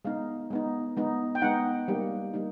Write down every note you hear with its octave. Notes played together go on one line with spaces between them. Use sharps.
G#3 B3 D#4 F5
G#3 B3 D#4
G#3 B3 D#4
G5
G#3 B3 D#4 F#5
G3 A#3 D#4 G4
G3 A#3 D#4 G4